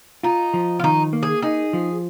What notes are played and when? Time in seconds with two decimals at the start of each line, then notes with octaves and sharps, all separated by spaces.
0.23 D#4 F4
0.54 F3
0.79 F4
0.83 D#3 D#4
1.13 A#3
1.23 G#4
1.42 D#4 G#4
1.73 F3